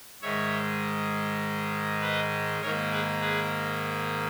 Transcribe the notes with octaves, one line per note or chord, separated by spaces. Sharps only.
G#2 D#3 G#3 C#5 E5
B4 D#5
G#2 D#3 A#3 A#4 C#5
G#4 B4
G#4 B4